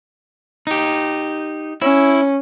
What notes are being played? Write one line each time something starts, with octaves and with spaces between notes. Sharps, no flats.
D#4 G4
C#4 E4